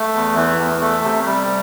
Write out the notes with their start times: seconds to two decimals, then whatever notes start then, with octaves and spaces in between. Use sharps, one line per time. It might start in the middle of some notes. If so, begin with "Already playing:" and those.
Already playing: A3
0.14 E2
0.36 E3
0.59 E2
0.80 A3
1.04 C3
1.26 G3